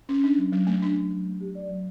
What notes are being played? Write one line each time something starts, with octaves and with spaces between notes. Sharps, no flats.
C#4
D4
F#3
F#3
A3
D4
F#3
F#3
A3
G4
D5
F#3